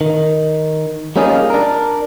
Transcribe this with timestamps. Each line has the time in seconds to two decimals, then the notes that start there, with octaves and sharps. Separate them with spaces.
0.01 D#3
1.16 G3 A#3 C#4 D#4 F4 G#4
1.50 D4 A#4